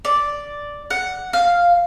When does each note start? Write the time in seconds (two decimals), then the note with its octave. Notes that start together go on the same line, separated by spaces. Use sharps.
0.05 D5
0.90 F#5
1.33 F5